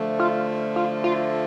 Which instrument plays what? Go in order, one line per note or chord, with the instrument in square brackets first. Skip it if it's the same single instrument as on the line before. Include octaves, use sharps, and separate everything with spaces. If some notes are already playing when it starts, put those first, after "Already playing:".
Already playing: [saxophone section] D3 F3 A3
[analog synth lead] F4
F4
F4